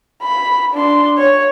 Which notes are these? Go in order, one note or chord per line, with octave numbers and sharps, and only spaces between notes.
B5
D4 C6
C#5